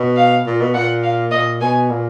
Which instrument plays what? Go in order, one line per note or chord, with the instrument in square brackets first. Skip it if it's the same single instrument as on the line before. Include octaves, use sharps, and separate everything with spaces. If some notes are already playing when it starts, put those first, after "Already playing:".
Already playing: [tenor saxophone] B2
[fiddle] F5
[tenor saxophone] A#2
B2
[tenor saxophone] A#2 [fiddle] F#5
[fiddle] F5
[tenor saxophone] A#2 [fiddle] D#5
[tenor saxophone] B2 [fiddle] G#5
[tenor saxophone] A#2